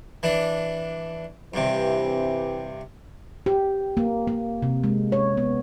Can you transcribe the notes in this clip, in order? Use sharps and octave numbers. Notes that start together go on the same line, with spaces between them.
E3 D4
G2 C3 E3 C4 G4
G4
A#3
A#3
C3
G#3
C#5
B3